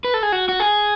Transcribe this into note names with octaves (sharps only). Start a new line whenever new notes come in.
B4
A4
G#4
F#4
F#4
G#4